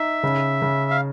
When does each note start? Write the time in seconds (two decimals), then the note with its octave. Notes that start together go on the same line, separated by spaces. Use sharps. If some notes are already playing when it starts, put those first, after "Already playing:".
Already playing: D#4 E5
0.23 C#3
0.62 C#3
0.91 F5